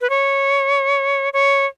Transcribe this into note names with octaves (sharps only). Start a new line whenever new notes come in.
B4
C#5
C#5